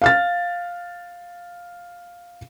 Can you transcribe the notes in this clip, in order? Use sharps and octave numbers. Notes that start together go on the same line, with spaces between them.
F5 F6 A6